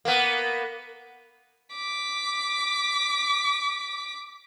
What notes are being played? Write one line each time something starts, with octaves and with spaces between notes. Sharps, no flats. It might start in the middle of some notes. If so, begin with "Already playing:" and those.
A#3 B3
D6 B6